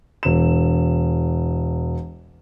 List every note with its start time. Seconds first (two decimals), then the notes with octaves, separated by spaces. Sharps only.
0.23 E1 E7